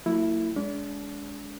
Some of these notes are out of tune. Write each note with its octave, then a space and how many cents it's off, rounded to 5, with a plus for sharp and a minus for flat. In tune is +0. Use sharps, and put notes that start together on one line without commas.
F#3 -35 A#3 -45 E4 +0
G#3 +0 D4 -35